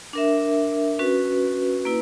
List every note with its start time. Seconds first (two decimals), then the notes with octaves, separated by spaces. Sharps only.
0.13 D4 A#4 E5
0.99 C#4 F#4 B4
1.85 A#3 E4 B4